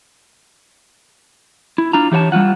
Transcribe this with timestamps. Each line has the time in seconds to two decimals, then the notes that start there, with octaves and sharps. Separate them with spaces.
1.78 E4
1.93 D4 F4 A#5
2.12 E3 G4 C#5 F5 A5
2.32 G3 G#3 F4 F#5